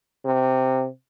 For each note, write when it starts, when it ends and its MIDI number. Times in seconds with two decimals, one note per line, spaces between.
0.25 0.86 48